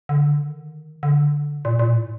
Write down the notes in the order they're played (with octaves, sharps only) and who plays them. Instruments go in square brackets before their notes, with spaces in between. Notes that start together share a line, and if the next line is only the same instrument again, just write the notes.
[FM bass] D3
D#3
D3
A#2
A#2
A2